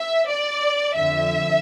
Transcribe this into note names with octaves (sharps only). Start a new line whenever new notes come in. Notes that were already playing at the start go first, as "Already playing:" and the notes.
Already playing: E5
D5
F2 D3 F3 E5